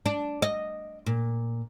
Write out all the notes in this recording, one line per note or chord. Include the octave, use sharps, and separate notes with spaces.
D4
D#5
A#2